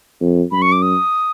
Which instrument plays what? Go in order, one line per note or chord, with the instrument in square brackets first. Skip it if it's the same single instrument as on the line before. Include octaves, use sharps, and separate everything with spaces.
[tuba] F2
[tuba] F#2 [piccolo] B5
[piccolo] C#6
D6
D#6